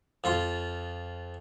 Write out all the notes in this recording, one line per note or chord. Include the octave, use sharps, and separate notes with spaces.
F2 F4 C6